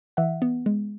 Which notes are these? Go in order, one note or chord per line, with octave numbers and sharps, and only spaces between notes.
E3 E5 F#5
B3
G#3